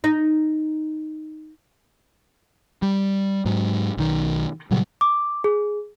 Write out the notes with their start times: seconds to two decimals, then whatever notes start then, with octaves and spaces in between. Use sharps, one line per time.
0.04 D#4
2.82 G3
3.45 G#2 F#3
3.97 B1 D#3
4.71 A#2 C#3 F#3 G3
5.01 D6
5.44 G#4